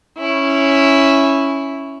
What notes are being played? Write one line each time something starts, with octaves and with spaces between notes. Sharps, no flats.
C#4 E4